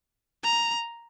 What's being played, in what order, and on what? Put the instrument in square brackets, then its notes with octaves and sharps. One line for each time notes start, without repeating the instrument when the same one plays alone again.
[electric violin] A#5